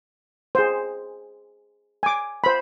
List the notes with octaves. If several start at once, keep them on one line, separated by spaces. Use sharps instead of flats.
G#4 C5
G#5 D6
C5 B5